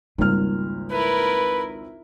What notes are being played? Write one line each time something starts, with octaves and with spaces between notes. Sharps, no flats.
G#1 C#2 G3 A#3 F6
E4 A#4 B4